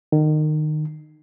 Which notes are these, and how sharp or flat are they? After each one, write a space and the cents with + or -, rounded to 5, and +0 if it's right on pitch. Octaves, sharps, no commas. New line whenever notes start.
D#3 -25